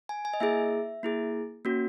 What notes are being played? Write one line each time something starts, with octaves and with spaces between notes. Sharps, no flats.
G#5
G#5
D#5
A#3 E4 G#4 E5
A#3 E4 G#4
A#3 C#4 F#4